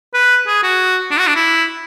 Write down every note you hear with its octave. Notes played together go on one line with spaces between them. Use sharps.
B4
G#4
F#4
D4
F#4
D4
E4